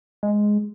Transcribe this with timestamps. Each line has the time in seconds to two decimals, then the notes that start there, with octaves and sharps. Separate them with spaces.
0.23 G#3